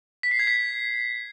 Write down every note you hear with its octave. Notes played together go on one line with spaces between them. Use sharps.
B6
C7
G#6
B6